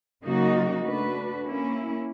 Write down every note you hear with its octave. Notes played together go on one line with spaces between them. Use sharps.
C#3 F#3 A#3 D#4 F#4
A3 D4 F#4 B4
A#3 C#4 E4